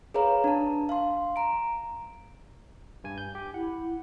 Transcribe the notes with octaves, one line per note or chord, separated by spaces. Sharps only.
G#4 B4 C#5 F5 A#5
D4 A5
F5 C6
A#5 D7
G2 G#5
G6
G4
E4 F#5